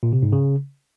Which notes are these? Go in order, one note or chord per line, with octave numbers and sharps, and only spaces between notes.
A#2
C3
G#2
C#3